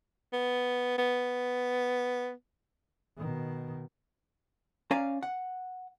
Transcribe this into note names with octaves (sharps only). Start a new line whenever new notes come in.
B3
B3
B2 D#3
C#4 D5 F5 G#5 A#5
F#5